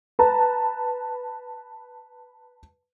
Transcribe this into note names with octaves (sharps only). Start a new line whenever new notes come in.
B4 A5 A#5